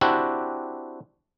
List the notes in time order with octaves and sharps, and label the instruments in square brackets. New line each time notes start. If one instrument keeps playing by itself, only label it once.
[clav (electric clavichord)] C4 D4 E4 F#4 G4